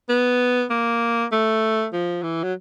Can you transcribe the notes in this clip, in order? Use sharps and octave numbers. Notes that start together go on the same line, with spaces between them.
B3
A#3
A3
F3
E3
F#3